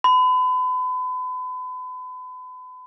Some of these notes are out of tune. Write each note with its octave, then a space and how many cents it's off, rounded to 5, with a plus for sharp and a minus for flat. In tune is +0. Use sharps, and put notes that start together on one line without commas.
B5 +40